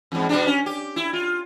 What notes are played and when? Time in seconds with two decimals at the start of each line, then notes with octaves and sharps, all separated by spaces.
0.12 E2 G#2
0.29 B2 G3 D4
0.47 C#4
0.66 G4
0.96 E4
1.13 F4